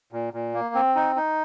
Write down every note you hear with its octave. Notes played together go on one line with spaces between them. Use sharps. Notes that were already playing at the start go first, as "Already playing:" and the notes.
A#2
A#2
A#3
C4
D#4
D#4